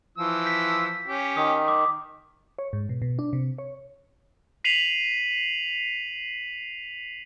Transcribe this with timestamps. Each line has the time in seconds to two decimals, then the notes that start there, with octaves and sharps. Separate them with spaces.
0.18 E3 F3 E6
0.45 G6 B6
1.07 C#4 G4
1.37 D#3 D#6
1.68 D6
2.59 C#5
2.73 G#2
2.89 B2
3.02 B2
3.19 D4
3.33 C3
3.58 C#5
4.64 B6 C7 D#7 F7 F#7